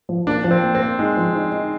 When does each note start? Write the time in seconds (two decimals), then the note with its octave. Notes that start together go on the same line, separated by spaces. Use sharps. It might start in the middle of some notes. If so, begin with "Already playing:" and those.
0.09 F3
0.27 A#3 D4
0.44 F3
0.51 C4
0.63 A#3
0.75 C4
0.81 A#3
0.99 G#3 D#4
1.17 F3
1.34 D#4
1.52 D#4